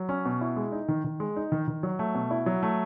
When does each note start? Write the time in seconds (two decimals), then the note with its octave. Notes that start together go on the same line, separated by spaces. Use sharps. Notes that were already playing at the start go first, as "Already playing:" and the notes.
Already playing: F#3
0.09 C#4
0.25 B2
0.41 E4
0.57 G#3
0.72 D#4
0.88 D#3
1.04 D#3
1.20 G#3
1.36 D#4
1.52 D#3
1.68 D#3
1.83 F#3
1.99 A3
2.15 B2
2.31 E4
2.46 F#3
2.63 A3